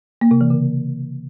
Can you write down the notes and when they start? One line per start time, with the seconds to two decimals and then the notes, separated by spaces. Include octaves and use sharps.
0.21 A#3
0.31 C3
0.41 E3
0.50 C#3